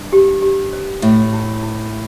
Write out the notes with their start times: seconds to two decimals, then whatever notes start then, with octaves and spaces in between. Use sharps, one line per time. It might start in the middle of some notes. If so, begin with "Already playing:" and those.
Already playing: G2
0.13 G4
0.42 G4
0.73 C#5
1.02 A2 E5
1.33 E4
1.63 E4